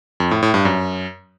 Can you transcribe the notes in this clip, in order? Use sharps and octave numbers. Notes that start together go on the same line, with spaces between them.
F2
A2
A2
G2
F#2